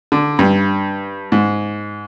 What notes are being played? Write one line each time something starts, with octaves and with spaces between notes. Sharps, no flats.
D3
G2
G#2